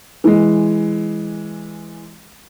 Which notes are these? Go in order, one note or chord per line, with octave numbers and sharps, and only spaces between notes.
E3 G#3